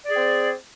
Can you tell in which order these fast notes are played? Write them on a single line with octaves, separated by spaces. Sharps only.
D5 G#4 C4